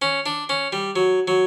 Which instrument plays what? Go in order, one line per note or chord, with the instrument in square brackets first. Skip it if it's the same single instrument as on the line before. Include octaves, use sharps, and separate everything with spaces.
[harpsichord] C#4
D4
C#4
G3
F#3
F#3